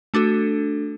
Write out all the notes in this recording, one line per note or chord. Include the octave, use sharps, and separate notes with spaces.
A3 D4 F#4 A4